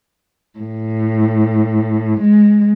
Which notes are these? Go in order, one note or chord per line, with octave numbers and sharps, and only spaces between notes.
A2
G#3